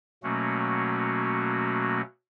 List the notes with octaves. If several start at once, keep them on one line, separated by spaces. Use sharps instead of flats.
B2 F#3 A3 A#3 C#4 F#4